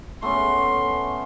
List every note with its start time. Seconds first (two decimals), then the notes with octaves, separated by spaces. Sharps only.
0.22 A3 B3 C#4 C6